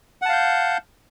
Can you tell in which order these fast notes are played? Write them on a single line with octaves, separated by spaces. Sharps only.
F#5 A5 F5 G6